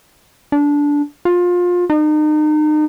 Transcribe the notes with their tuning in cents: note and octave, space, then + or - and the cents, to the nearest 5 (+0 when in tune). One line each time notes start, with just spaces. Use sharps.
D4 -15
F4 +25
D#4 -35